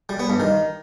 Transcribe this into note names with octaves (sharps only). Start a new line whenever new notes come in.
G3
B3
G2
D#3